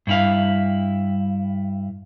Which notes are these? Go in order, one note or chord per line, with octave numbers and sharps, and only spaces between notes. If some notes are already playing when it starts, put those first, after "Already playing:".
G2 E4 F5